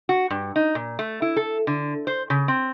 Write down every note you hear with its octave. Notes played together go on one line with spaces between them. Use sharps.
F#4
G2
D#4
A#2
A3
E4
A4
D3
C5
C#3
C4